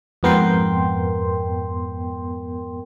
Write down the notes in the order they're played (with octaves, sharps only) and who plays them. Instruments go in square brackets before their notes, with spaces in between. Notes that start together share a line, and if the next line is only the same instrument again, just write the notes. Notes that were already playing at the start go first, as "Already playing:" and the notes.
[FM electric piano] F2 G#2 B3 A#4 G5 C6